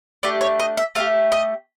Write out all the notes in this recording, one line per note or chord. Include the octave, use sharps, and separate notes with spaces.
A3 D4 G4 D5
C#5
D#5
E5
A3 D4 G4 F5
D#5